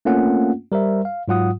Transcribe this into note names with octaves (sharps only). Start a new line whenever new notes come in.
A3 A#3 C4 C#4 F4 F#5
G3 A#4 C5 E5
F5
G#2 F#3 F4 F#5 D#6